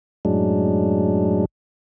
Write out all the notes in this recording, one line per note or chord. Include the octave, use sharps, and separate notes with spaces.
F#2 A2 F#3 G#3 D4